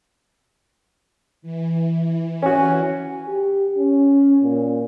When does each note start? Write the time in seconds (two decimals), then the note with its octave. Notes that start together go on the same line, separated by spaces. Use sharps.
1.42 E3
2.42 C#4 F#4 G#5
3.28 G4
3.77 C#4
4.42 A#2